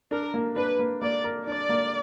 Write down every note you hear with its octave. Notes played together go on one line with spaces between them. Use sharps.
D4 A#4
A#3
D4 B4
A#3
A#3 D5
A#4
D4 D5
A#3